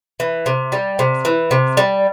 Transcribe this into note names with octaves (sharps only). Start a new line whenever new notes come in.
E3
C3
G3
C3
E3
C3
G3